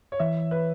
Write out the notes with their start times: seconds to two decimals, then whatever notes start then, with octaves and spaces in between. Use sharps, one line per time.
0.12 C#5
0.20 E3 E5
0.51 B4